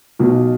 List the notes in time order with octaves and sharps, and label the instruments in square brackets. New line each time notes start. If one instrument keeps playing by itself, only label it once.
[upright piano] B1 B2